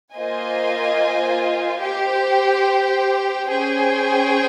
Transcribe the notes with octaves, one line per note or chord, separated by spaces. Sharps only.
A#3 F4 C5 D#5 G#5
G4 C5 G5
C#4 G#4 C5 G5